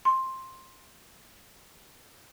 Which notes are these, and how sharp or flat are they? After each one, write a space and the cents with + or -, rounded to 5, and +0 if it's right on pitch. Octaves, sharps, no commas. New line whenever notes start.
C6 +10